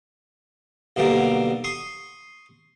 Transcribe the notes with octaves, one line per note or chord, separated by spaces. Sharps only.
B1 B2 D3 G3 A#3
C6 C#6 D#6